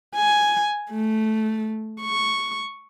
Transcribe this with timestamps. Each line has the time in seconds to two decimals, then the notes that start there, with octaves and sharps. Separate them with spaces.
0.16 G#5
0.91 A3
2.02 C#6